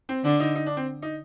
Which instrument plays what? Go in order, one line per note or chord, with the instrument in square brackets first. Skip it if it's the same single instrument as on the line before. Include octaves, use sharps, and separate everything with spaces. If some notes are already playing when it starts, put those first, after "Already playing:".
[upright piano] C4
[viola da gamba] D3 [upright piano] D4
[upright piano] D#4
D#4
D4
C4
D#4